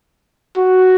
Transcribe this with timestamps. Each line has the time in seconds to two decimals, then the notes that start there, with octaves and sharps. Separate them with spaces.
0.58 F#4